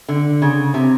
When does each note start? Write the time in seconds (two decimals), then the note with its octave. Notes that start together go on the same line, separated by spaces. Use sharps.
0.09 D3
0.42 C#3
0.74 C3